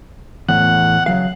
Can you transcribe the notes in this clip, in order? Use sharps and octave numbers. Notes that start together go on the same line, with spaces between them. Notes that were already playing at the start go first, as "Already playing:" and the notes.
E2 A2 F#5
C#3 F#3 F5